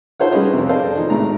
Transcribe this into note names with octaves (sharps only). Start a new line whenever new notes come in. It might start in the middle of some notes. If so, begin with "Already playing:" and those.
F4 A4 C5 C#5 F#5
G3 C#4 G#4 B4 C#5 D#5
F2 C3
G#4 A4 C5 D5 D#5 F5
D#3 F3 D#4
G#1 A2 A#5